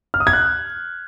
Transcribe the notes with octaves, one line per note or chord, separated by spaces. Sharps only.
F6
D#6
G#6
F#6